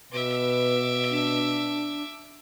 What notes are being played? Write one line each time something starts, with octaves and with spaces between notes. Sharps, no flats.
B2 B4 E5 D6
D4